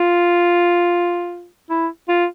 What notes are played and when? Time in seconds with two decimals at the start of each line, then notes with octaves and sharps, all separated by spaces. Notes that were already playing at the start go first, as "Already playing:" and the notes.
Already playing: F4
1.70 E4
2.08 F4